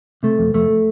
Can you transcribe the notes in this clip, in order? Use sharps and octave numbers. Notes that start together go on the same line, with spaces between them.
C3 A3
F2
F2 A3